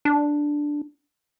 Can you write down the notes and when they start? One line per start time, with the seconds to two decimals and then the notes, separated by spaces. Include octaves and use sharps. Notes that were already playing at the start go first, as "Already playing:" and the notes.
0.05 D4